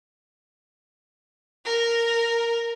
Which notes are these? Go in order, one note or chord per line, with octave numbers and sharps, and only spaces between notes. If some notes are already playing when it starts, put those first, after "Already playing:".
A#4